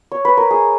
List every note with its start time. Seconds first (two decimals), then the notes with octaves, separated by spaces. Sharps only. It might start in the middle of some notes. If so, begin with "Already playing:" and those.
Already playing: D#5
0.12 C#5
0.25 B4
0.37 A#4
0.51 G#4